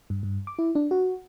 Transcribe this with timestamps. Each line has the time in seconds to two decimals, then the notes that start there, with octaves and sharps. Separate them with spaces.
0.10 G2
0.23 G2
0.47 D6
0.59 E4
0.75 D4
0.91 F#4